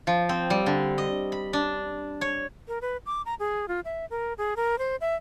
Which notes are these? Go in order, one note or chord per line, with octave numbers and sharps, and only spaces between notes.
F3
C4
G3
D3
D#5
B5
D4
C#5
A#4
B4
D6
A#5
G#4
F4
E5
A#4
G#4
A#4
C5
E5